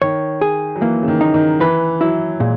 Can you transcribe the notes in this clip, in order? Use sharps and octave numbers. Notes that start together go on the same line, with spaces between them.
D#3 C#5
G#4
F#3
E3 A#3
C#3
D#3
D#4
D#3
E3 B4
F#3 E4
A#2 G#3